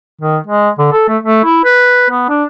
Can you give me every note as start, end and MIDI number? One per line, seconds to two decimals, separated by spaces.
0.21 0.37 51
0.47 0.69 56
0.78 0.87 50
0.92 1.05 69
1.08 1.17 57
1.23 1.42 57
1.44 1.62 64
1.65 2.06 71
2.10 2.27 59
2.29 2.44 62